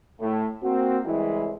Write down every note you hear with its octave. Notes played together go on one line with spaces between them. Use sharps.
A2
A#3 C4 F#4
C2 E3 G3 G#3 E4